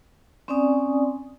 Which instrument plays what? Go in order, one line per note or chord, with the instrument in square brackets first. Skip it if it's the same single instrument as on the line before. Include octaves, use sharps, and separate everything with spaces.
[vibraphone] C4 C#4 D5 G#5 D#6